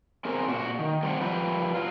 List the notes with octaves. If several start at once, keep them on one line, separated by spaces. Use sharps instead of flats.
C4 G#4 A#4 C#5
A#2 F#4
D#3
F#3 G3 C4 D5 F5 F#5
F3 G3 B4
F#3 F4